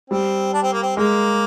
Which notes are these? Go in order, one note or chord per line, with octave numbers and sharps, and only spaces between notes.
G3 C4
D4
C4
A#3
C4
G#3 A#3